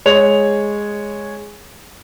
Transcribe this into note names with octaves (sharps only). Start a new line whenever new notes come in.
G#3 C#5 F7